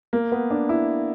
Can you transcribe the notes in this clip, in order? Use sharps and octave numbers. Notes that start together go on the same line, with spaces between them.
A#3
B3
D4
E4